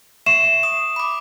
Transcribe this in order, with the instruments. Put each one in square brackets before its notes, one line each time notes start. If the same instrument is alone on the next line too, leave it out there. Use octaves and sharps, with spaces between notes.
[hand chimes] E5 C#6 C7 [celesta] E7
[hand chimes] D#6
B5 D6